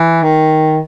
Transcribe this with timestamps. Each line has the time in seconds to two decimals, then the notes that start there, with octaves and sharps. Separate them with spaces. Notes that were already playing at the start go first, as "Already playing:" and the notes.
Already playing: E3
0.23 D#3